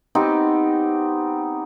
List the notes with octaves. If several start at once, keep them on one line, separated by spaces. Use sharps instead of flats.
B3 C4 D#4 G4